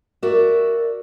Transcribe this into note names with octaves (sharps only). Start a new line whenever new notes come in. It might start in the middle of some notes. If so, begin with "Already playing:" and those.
F#4 A#4 D5 E5